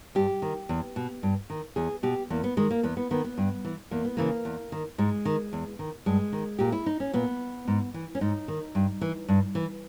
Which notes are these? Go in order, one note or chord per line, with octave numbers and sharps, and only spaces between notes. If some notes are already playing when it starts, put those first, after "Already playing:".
G2 G4
D#3
E2
B2
G2
D#3
E2 G#4
B2 G4
E2 A#3
B3
D#3 G#3
A#3
E2 B3
B3
D#3 B3
B3
G2
E3
E2 A#3
B3
C#3 E3 A#3
E2
D#3
G#2 G#3
D#3
E2
D#3
G2 G#3
D#3
A#2 G4
E4
D#4
C#4
A#2 B3
G#2
E3
C#4
G#2 D#4
D#3
G2
E3
G2
E3